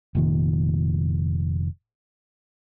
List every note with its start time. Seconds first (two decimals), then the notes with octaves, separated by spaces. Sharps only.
0.15 F1 A#2 D#3